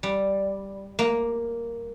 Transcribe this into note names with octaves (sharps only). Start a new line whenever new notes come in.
G3
A#3